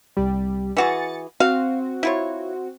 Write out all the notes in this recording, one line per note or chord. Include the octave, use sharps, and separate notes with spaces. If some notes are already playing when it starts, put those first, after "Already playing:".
C2 G3
E3 F#4 G#4 A6 C#7
C4 F#4 F5
E4 F4 C#5